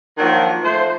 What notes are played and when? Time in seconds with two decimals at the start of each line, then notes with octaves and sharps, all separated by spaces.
0.18 D#3 F3 F#3 A#3 D4
0.63 F3 A3 C5